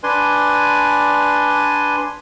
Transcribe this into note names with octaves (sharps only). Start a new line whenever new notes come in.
D4 B4 D5 G#5 C6